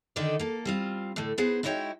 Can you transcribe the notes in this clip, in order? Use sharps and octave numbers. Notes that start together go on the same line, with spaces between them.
D3 D#3 D#4 F#4 A4 D5
A#3 A4
G3 C4 F4
A2 D3 A3
B3 D#4 G#4 B4 C5
G#3 D#4 E4 F#4 C#5 G5